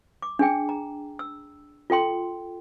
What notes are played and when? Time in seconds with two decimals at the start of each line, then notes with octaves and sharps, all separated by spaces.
0.22 D6
0.39 D4 G#4 G5
0.69 A#5
1.19 E6
1.90 F4 A4 G5 C6